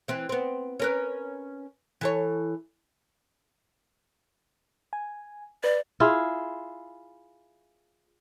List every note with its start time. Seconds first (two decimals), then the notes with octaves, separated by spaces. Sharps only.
0.08 E3 C4
0.29 B3 C4
0.80 C#4 A#4 B4
2.01 E3 A4 C#5
4.93 G#5
5.64 B4 D5
6.00 E4 F4 G#4